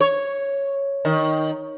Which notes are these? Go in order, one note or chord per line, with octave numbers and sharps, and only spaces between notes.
C#5
D#3